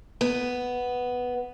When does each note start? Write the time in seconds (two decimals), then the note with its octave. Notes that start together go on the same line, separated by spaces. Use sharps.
0.21 B3